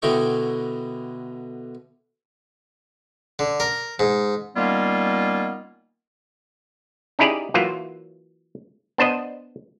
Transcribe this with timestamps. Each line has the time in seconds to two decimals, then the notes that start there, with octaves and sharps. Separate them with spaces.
0.02 B2 D3 E4 D#5 G5 C#6
3.39 D3
3.60 A#4
3.99 G#2
4.56 D#3 G3 A#3 B3 C#4 F4
7.19 C#4 D#4 E4 G4 G#4 D5
7.54 E3 F#3 A#3 F4
8.98 B3 D4 C5 D#5